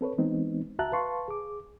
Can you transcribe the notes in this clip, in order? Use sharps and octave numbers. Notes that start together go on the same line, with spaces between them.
C4 A4 B4 C#5
E3 G#3 B3 C4 D#4
C#2 F#4 E5 A5 A#5 F#6
B4 F5 A5 C6 C#6
G#4 D6